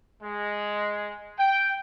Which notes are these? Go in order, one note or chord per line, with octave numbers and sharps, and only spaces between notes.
G#3
G5